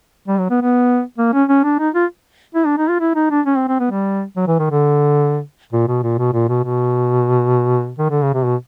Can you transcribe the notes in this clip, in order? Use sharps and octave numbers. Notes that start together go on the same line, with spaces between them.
G3
F#3
B3
B3
A#3
C#4
C#4
D4
D#4
F4
E4
D4
D#4
F4
E4
D#4
D4
C#4
C4
C4
B3
G3
F#3
E3
D#3
D3
A#2
B2
A#2
B2
A#2
B2
B2
D#3
D3
C#3
C3
B2